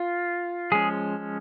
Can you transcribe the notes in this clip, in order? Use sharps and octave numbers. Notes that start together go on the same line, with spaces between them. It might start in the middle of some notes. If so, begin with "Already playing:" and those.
Already playing: F4
F3 G#3 C#4 G#4